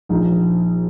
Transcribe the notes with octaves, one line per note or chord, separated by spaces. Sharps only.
A#1 D#4